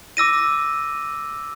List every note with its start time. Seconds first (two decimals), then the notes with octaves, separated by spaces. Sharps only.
0.17 D6 E6 A#6 D#7